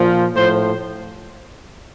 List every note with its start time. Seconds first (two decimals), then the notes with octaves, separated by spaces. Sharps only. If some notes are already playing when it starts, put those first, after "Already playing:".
Already playing: A#2 F3
0.35 A2 F3 C5